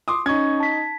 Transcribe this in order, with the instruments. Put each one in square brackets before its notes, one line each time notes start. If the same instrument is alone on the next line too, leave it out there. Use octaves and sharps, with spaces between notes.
[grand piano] C6 D6 D#6
[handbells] C#4 C#6 [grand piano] D#4 G#6
[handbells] A5 B6